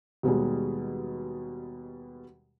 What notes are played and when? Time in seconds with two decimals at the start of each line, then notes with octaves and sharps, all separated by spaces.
0.23 D#2 B2 G3 G#3